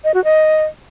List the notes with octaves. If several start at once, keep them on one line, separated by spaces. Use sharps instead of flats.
D#5
F#4
D#5